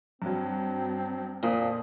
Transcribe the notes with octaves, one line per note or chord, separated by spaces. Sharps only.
G2 F#3 C4
F2 A#2 F3 F4 D#6